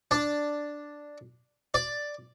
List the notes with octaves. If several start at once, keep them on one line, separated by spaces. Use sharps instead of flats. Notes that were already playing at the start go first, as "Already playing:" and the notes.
D4
D5